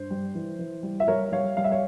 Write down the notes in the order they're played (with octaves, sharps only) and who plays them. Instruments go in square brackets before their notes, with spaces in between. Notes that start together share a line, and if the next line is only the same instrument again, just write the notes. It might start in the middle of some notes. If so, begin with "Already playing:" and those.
Already playing: [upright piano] G2 C5
G3
E3
E3
G3
E5
G3 A#4 C#5
G3 C#5 F5
G3 F5
E5
C#5 F5